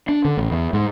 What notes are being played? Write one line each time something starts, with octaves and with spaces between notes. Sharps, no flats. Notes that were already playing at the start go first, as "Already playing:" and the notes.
D4
D3
A1
E2
G#2